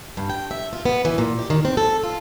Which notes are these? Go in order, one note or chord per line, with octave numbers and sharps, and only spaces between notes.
G2
G5
E5
F4
B3
E3
A#2
G4
D#3
C4
A4
F4